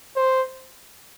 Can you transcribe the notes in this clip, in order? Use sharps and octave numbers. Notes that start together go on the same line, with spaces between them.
C5